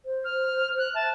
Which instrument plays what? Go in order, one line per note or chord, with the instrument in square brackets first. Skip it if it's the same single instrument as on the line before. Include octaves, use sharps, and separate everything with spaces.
[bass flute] C5
[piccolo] F6
F#6
[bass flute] E5 [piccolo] A5